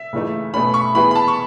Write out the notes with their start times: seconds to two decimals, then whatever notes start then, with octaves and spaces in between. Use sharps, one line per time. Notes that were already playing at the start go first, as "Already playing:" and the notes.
Already playing: E5
0.13 C#3 E3 A3 D#4
0.54 B2 A3 C#4 B5
0.74 C#6
0.94 E3 B3 E4 G#4 B5
1.11 B5
1.15 A5
1.28 C#6